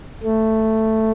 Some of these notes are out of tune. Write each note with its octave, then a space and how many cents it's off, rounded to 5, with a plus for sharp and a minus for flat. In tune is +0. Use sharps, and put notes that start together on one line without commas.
A3 +5